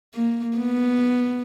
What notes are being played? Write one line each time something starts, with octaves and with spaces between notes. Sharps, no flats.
A#3
B3